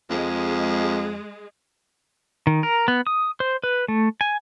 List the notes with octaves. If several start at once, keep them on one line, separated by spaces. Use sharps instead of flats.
F2 G#3
D#3
A#4
B3
D#6
C5
B4
A3
G#5